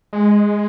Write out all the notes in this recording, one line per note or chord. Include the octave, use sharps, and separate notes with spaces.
G#3